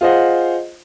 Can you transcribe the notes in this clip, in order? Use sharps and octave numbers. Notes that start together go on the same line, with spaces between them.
F4 G#4 C5 D#5 F#5